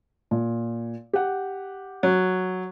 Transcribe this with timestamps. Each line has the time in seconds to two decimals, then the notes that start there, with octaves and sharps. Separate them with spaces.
0.31 A#2
1.13 G4 F#5
2.03 F#3